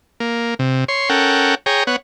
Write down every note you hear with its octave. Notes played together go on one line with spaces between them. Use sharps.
A#3
C3
C#5 C6
C#4 A4 A#4 F#5 G5
G#4 C#5 G5 A#5
B3 C#5 F#5